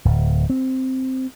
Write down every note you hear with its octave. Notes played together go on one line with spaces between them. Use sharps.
D1
C4